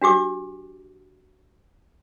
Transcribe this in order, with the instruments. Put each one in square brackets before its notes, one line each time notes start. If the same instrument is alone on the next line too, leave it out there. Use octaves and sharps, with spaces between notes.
[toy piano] D4 F#4 G4 D6